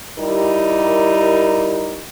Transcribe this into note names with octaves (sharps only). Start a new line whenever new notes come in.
G3 D#4 E4 G4 A#4